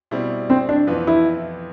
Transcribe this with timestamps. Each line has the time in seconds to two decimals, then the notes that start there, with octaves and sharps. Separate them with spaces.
0.11 B2 G3 C4 E4
0.50 C4
0.69 D4
0.87 F2 E3 B3 F4 B4
1.07 E4